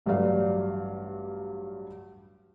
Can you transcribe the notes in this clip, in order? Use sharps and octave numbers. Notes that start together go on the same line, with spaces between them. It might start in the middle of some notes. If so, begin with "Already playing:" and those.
A1 G2 F#3 G3 D5 F5